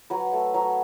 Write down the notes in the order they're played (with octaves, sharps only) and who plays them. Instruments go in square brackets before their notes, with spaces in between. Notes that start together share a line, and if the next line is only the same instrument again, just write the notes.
[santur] F#3 B4
A3
F#3